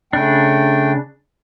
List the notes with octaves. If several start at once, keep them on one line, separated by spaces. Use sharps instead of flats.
C#3 A3 D4 G5